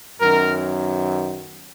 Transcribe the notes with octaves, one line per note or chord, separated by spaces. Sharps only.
F#2 D#3 F#3 B3 A#4